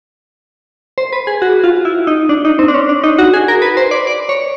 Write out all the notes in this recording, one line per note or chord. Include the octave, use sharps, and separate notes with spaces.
C5
B4
G#4
F#4
F4
E4
D#4
D4
D#4
C4
D4
C#4
D4
D#4
F#4
G#4
A#4
B4
C5
D5
D5
C#5